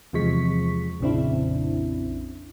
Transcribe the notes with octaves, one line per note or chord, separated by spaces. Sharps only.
E2 C3 F3 G#3 C#6 B6
A#1 F2 C#3 C4 D4 E4